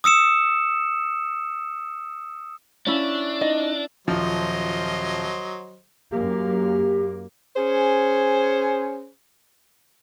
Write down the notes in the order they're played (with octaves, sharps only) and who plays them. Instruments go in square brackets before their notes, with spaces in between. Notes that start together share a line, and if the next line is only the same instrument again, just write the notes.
[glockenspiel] D#6 E6 C#7 E7
[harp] C#4 E4 [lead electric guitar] D4
[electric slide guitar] D#4 [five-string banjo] D#5
[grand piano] D#1 F3 [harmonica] F#3 C5 D#5
[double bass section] F#2 A#3 [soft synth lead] G4
[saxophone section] C#4 G#4 C5